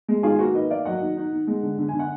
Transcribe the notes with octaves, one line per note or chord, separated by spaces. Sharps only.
G#3
D#3 F4 G#4
A#3 F#4
D#3 B4 D#5
A#3 D5 F5
F#3 D#5 F#5
D#3
D#4
D#3
G#3
D3
D3
G#5
D3 F#5